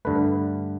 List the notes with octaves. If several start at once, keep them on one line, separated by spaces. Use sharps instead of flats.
G2 D3 A3 B4